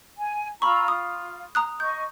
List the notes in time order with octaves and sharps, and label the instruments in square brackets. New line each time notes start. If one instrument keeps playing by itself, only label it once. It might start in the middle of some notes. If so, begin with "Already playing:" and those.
[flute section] G#5
[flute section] F4 A#5 E6 [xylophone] B5 C#6
[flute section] F4 [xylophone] D#6
[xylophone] A#5 D#6 F#6
[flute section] D#5 C#6 [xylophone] G6